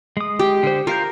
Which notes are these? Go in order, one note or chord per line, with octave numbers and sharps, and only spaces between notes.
G#3 D#6
G4
D3 C5
F4 A#4 F5 G6